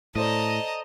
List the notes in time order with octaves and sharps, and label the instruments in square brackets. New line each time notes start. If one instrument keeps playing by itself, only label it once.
[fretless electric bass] A2 [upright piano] A4 C5 D5 [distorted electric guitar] D#5 [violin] A5 A#5